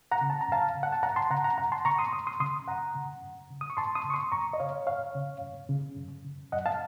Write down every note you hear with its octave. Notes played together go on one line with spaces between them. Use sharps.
F#5 A#5
C#3
A5
A#5
F#2 F5 A5
C#3
F#5
A5
F#2 F#5 A#5
A5 C6
C#3 F#5 A#5
F#5 A#5
F#2 F#5 A#5
A5 C6
C#3 A#5 C#6
C6 D#6
F#2 C6 D#6
C6 D#6
C#3 C6 D#6
F#2 F#5 A#5
C#3
F#2
C#3
D#6
C#6
F#2 A5 C6
C6 D#6
C#3
C#6
C6 D#6
F#2 A#5 C#6
D#5
C#3 C#5 F5
F#2 C#5 F5
C#3
F#2
C#3
F#2
C#3
F#2 D#5 F#5
F5 A5